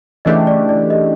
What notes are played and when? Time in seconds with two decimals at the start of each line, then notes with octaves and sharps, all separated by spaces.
0.25 C#3 E3 A3 D4 G4 D#5
0.47 D5
0.69 D5
0.90 D#5